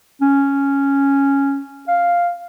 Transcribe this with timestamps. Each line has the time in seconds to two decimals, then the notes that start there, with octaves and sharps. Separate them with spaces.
0.21 C#4
1.88 F5